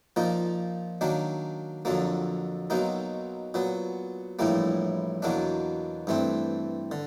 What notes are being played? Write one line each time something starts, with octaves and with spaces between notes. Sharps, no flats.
A#2 F3 A#3 D#4
D#3 F#3 A#3 D4
F2 D3 F#3 A#3
B1 B2 F#3 A#3 D#4
A#2 F#3 B3
A#1 A2 E3 G3 A#3
E2 B2 F#3 A#3 D4
G2 E3 A3 C4
D3